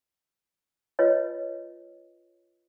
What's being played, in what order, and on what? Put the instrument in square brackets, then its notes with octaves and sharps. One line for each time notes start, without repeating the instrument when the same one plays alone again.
[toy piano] F4 B4 C#5 D#5